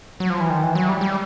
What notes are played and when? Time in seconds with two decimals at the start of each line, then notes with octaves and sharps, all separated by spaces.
0.20 F#3
0.30 F3
0.40 E3
0.50 D#3
0.63 E3
0.75 F#3
0.89 G3
1.01 G3